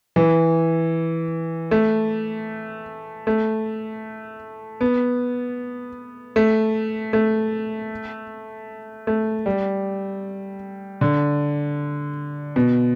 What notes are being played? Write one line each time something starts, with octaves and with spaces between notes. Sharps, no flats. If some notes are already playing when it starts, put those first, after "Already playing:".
E3
A3
A3
B3
A3
A3
A3
G3
D3
B2